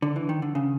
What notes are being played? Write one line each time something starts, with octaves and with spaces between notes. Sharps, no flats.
D3
E3
D#3
D3
C#3